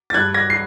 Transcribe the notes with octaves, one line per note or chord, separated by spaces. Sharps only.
A6
G2 F#6 G#6
G#6 A#6
C7